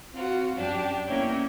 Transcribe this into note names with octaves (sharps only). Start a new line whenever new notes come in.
C4 F4 F#4
F#2 D4 G4
A#3 B3 C#4 E4 C#5 G5